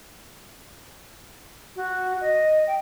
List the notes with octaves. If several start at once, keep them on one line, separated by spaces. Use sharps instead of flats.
F#4
D#5
G5